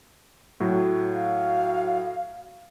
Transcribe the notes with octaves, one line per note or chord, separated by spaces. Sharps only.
A2 F#3
F5